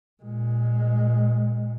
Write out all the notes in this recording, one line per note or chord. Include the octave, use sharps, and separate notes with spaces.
A#2 G#3